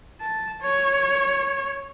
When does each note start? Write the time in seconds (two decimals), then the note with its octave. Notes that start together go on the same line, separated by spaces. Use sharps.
0.20 A5
0.62 C#5